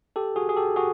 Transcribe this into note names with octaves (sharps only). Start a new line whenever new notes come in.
G4 A4
F#4 G#4
G#4
G4 A4
F#4 G#4